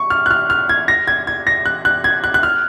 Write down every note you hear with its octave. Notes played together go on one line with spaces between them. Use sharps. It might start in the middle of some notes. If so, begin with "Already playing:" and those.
Already playing: C#6
F6
F#6
F6
F6
G#6
A#6
G#6
G#6
A#6
F#6
F#6
G#6
F#6
F#6
F6